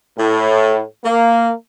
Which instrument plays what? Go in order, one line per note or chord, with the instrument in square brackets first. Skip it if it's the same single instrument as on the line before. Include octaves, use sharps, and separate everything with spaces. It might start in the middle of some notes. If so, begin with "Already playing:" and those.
[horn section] A2
A#3